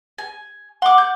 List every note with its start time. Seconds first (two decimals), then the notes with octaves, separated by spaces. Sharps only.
0.18 G#5
0.82 F#5 C6 D6
0.98 G6